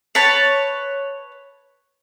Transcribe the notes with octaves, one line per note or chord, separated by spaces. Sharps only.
B4 C#5 A5